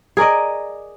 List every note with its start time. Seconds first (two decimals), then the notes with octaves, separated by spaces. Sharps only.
0.17 G#4 A#4 D5 D#5